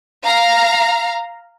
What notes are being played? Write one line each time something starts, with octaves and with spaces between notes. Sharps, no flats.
F5 A#5